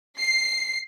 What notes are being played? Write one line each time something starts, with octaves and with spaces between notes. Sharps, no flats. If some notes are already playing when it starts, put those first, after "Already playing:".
C7